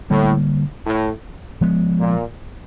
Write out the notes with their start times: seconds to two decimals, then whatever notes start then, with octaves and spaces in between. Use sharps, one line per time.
0.10 A2 D3 G3 A#3
0.86 A2
1.61 F3 G#3 B3
2.00 A#2